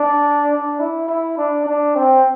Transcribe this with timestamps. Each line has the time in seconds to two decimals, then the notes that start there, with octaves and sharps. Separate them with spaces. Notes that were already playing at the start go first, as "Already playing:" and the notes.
Already playing: D4
0.51 D4
0.80 E4
1.09 E4
1.37 D4
1.66 D4
1.96 C4